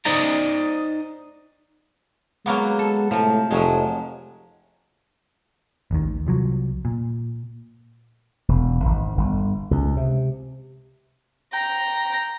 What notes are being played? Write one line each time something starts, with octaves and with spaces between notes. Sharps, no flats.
D#4 C5 D5 D#5 A#5
F#3 G#3 A#3 B3
A4
A2 C3 F3
F1 F3 F#3 G#3
A1 D#2 D#3
C2 F3 F#3
A#2
E1
G#1
G1
C#2
C3
G5 A#5